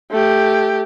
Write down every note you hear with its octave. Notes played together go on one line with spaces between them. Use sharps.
A3 G4